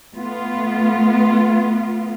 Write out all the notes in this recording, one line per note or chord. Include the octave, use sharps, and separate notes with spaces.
A3 B3 F4